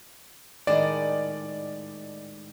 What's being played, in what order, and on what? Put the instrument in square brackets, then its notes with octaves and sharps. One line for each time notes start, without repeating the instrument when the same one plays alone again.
[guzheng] A2 D#3 G#3 [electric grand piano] D5